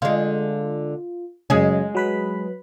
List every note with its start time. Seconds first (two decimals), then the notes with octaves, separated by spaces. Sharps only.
0.02 D3 G#3 F4
1.50 F#2 C#3 G#3 G#4
1.95 F#3 B4 B5